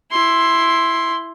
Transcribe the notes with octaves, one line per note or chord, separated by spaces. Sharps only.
E4 C6